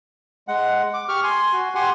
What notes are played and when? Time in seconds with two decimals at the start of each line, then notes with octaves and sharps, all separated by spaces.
0.48 G#3 F#5
0.94 D6
1.09 G4 C#6 F6
1.23 G#5 C6
1.53 F#4
1.75 G4 F#5 G#5 C6